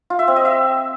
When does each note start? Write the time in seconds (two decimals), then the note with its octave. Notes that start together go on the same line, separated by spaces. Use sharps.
0.10 F4
0.19 E5
0.28 C4
0.36 D#5
0.45 E5